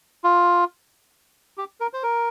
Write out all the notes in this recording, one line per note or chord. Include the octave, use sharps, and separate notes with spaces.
F4
G4
A#4
C5
A#4